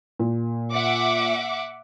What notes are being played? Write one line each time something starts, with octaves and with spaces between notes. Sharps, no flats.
A#2
E5 F#5 D6